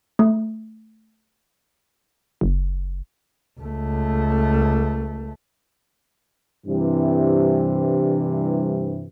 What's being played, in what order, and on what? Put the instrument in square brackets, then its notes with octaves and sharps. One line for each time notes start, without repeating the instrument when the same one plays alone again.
[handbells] A3
[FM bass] F#1
[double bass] C#2 A3
[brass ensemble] G2 C3 E3